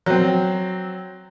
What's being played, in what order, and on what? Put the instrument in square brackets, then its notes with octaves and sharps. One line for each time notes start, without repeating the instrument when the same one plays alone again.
[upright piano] F#3 C4